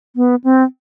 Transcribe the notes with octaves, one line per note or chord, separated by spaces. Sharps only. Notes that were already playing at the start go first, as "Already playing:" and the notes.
B3
C4